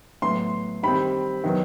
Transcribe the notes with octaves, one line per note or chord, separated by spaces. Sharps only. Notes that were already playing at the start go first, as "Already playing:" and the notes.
A2 F#3 B3 C6
D#3 G3 C4 B5
D#3 F#3 B3